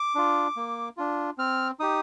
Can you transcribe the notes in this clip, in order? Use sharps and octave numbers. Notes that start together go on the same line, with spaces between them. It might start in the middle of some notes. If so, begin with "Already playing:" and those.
Already playing: D6
D4 F4
A#3
D4 F4
C4 F6
D#4 G4 D#6